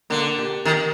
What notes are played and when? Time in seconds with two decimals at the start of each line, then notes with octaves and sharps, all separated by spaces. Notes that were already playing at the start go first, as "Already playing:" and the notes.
0.10 D3 A#3
0.38 G4
0.65 D#3 A#4